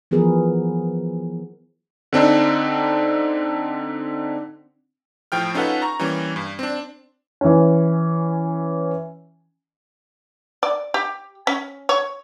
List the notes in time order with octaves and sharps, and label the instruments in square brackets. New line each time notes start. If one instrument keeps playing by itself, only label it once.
[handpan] E3 F3 B3 G#4 A#4 B4
[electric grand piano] D3 C4 D4 D#4
A2 F3 G5 F6
C#4 D#4 F4 A4 B4 F#5
A#5 C#6
E3 G3 A#3 C#4
G2
C4 D4
[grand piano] E3 C#4
[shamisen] D5
G4
C#4
C#5